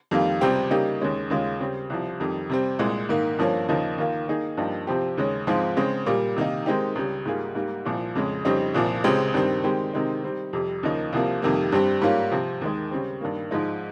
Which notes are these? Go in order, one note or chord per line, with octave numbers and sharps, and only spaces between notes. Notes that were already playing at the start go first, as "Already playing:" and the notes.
F2 D#3 G3 A#3 F4
C#2 C3 G3 C4 G4
C#3 G3 A#3 D#4 G4
D#2 C#3 G#3 C#4
D#2 C#3 G#3 C#4 F4
C#3 G3 C4
C2 C3 F3
F2 D#3 G3
C3 G3 C4
C2 A#2 G#3
G#2 D#3 A#3
G2 F3 A#3 C#4
D#2 C#3 F3 A#3 D#4
D#2 D#3 A#3 F4
D#3 A#3 D#4 G#4
G2 F3 A#3 D#4 G4
C3 F3 C4 G4
D#2 C#3 G#3 C#4
G#2 F3 G#3 C4 F4
C#3 G#3 C4
A#2 G3 A#3
C3 D#3 A#3 D#4
D#3 G#3 C4 D#4 G4
C#2 C#3 G3
G#2 G3 A#3 F4 G#4
G#2 G3 A#3
C2 A#2 F3
F2 C#3 G#3
F2 C#3 G3 C4 D#4
C2 A#2 F3
C#2 C#3 G#3 C4 G4
G2 D#3 G3 C4
D#3 G#3 C4 G4
C3 D#3 G#3 C4 D#4
D#3 G3 C4
F2 C3 G3
D#2 C#3 F3 A#3 D#4
C2 C3 F3 A#3
F2 C3 D#3 G3 A#3
G2 G3 C4 G4
G#2 G3 A#3 C#4 F4
C3 F3 C4
D#2 D#3 G#3
C#3 G3 C4
G2 D#3 A#3
G#2 F3 G#3 D#4